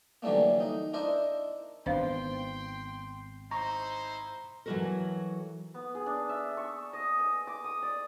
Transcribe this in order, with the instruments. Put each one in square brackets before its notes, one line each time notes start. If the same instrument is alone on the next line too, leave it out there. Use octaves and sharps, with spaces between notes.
[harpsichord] D3 E3 F#3 G3 A3 A#3
D#4
D4 E4 A#4 C5 D#5
[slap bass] G#1 B3 [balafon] D4 C5 F5 [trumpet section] G5 C6
[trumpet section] D#4 E4 C5 [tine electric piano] A#5 [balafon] C#6
[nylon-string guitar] E3 F#3 G3 F#4 A4 A#4
[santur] B3
G#4
D4
E5
C#6
D#5
D#5
D6
D#6
D5